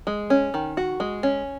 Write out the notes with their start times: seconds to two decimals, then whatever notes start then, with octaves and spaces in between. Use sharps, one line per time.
0.07 G#3
0.30 C#4
0.54 D#3
0.77 F#4
1.00 G#3
1.23 C#4